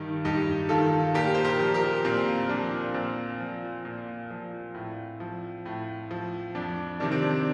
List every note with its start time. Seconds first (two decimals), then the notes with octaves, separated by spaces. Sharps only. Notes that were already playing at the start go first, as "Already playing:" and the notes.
Already playing: G2 D#3 G4
0.25 G2 D#4 G4
0.69 D#3 F4 A4
1.14 A#2 G4 A#4
1.35 C5
1.44 G4 A#4
1.60 F3
1.74 G4 A#4
2.05 A#2 C4
2.49 F3 D4
2.94 A#2 C4
3.40 F3
3.85 A#2
4.31 F3
4.74 A2
5.20 F3
5.66 A2
6.11 F3
6.55 F2 D4
7.00 C3 D#3 D4
7.12 C4
7.22 D4